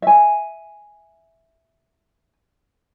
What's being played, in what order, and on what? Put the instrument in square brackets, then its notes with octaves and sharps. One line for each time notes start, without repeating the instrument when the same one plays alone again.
[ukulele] E5 G#5